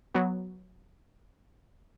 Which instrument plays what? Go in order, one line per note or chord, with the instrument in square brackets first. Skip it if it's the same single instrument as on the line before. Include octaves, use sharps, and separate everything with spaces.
[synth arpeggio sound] F#3 B3 F#4